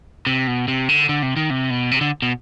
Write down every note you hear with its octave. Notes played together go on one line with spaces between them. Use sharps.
C3
B2
C3
D3
D3
C3
D#3
C3
B2
C3
D3
B2